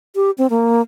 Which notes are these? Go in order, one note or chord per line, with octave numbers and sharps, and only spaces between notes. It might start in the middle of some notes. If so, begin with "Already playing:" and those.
G4
C4
A#3